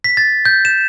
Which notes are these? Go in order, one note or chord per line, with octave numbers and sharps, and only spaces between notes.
B6
A6
G6
E7